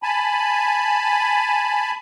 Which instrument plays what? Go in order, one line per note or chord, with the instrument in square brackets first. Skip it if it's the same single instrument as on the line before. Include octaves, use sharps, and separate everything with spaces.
[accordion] G#5 A5 B5